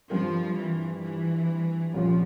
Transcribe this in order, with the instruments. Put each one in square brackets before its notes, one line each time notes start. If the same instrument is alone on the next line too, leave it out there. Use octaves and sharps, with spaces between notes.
[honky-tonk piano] G2 G3 C4 F4 A#4 [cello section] F3
[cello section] E3
E3
[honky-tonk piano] C2 A#2 G3 C#4 F4 [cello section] F3